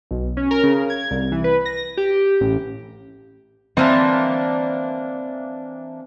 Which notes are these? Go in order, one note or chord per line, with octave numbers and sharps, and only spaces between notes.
B1
C#4
A#4
C#3
G#6
C2
E3
B4
A#6
G4
A1
E3 A#3 C4 D4